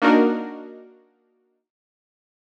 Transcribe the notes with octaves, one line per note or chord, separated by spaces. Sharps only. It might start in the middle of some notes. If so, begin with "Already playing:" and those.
A#3 D4 D#4 F#4 A#4